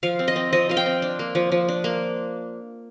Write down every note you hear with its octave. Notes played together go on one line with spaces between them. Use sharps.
F3 F5
C4
D#5
C4
F3 D#5
F3 F5
G5
C4
D4
A#3
F3
F3
D4
A#3